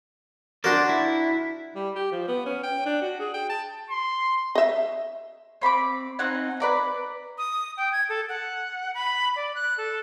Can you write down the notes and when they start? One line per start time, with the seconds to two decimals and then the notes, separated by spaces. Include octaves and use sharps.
0.64 D4 F#4 A#4 C5 D5
0.89 E4
1.75 G3
1.96 G4
2.12 F3
2.28 B3
2.46 C#4
2.63 G5
2.86 D4
3.01 F#4
3.20 G#4
3.34 G5
3.49 A5
3.90 C6
4.55 D#5 E5
5.62 C4 B5 C6 D6
6.19 C4 D#4 F#5 G#5
6.60 B4 D5 A#5
7.38 D#6
7.77 G5
7.92 G#6
8.09 A4
8.29 F#5
8.94 B5
9.36 D5
9.55 F#6
9.78 A4